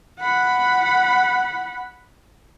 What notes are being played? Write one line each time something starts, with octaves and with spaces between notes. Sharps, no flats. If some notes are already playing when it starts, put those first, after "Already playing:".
F#5 B5